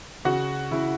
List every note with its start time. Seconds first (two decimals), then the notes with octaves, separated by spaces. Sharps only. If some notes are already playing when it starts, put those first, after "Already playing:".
0.25 C#3 F#4
0.71 C#3 E4